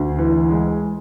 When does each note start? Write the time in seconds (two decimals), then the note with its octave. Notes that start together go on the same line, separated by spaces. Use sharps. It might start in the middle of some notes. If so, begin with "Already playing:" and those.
Already playing: D2
0.19 E3
0.50 G#3